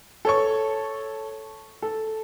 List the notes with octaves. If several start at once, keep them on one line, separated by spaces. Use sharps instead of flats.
A4 C#5 C#6
A4